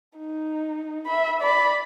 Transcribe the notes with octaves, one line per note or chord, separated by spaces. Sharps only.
D#4
E5 B5
D5 B5